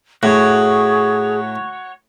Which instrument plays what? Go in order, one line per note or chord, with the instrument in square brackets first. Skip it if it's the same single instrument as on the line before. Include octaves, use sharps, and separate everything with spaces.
[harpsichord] A2 [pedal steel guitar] F#4 C#5 [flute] G#4